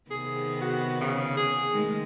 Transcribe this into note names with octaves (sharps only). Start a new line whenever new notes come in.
C3 D#3 B3 G#4
F#4
C#3
G#4
D#3 G#3 A3